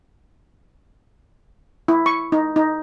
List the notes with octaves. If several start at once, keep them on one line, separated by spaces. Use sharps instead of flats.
E4
C#6
D#4
D#4